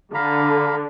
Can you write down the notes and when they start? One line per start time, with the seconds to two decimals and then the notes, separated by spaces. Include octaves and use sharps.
0.14 D3 F5 A#5 B5